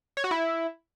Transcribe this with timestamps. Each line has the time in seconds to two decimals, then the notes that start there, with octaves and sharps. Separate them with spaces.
0.17 C#5
0.24 F#4
0.31 E4